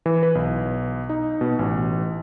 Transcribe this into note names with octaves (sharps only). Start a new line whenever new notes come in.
E3
B4
B1
D#4
B2
A1